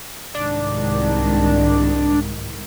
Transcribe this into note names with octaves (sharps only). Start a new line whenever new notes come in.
C2 G#2 D#3 D4